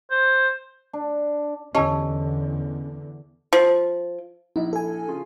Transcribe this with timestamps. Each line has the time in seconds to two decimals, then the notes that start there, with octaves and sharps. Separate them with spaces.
0.11 C5
0.93 D4
1.75 E2 D3 C#4 G4 D#5 A5 E6
3.53 F3
4.56 A#1 D#4 E4
4.73 A4 G#5
5.08 C#3 F4